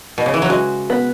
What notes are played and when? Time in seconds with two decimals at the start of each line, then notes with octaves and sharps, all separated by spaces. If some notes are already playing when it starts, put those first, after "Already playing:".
0.18 B2
0.26 C#3
0.34 E3
0.42 F#3
0.49 G#3 F#4
0.90 B3